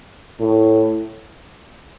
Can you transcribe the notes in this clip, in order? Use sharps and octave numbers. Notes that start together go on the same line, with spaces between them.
A2